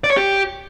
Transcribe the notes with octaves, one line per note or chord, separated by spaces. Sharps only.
D5
C#5
G4